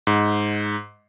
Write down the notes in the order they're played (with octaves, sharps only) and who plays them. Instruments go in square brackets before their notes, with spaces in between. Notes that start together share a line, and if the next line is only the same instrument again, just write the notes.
[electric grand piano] G#2